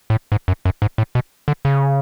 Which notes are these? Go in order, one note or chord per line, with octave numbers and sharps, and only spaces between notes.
A2
G#2
F#2
F#2
G#2
A2
B2
D3
C#3